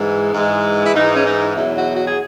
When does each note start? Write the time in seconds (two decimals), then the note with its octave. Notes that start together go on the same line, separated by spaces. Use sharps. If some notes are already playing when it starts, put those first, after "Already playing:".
Already playing: G#2 E3 G#3
0.33 G#2 E3 G#3
0.86 E4
0.94 G#2 E3 G#3 D#4
1.16 C#4
1.25 D#4
1.56 E2 B2 F#3 E4
1.77 F#4
1.96 F#4
2.08 G#4